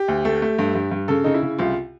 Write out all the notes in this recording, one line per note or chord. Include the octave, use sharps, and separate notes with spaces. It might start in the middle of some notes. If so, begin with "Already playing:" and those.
Already playing: G4
D2
A3
A3
G2
G2
G2
C#3 A4
C#3 D#4
E4
C#3
C2 F4